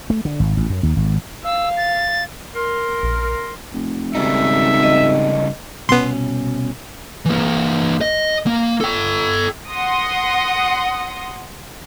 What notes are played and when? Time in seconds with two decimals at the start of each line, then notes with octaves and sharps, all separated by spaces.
0.10 A3
0.25 D3
0.40 G#1
0.57 A1
0.70 F#2
0.83 D#2
0.96 G#1
1.44 F5 E6
1.77 A6
2.55 A#4 C6
3.03 A#1
3.73 F1
4.15 G#1 C#3 G3 D#4 E5
4.83 D#5
5.89 C2 B2 B3 C#4 C6
7.25 E3 A#3
8.01 D#5
8.47 A#3
8.81 A4 G5
9.70 F#5 C6 D#6 A#6